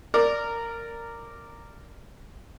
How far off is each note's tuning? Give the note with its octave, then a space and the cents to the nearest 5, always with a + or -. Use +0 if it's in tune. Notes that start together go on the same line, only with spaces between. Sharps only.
A#4 -10 D5 +0